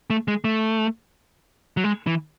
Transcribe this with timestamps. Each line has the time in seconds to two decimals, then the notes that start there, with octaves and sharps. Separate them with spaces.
0.10 A3
0.28 G#3
0.44 A3
1.77 F#3
1.84 G#3
2.07 E3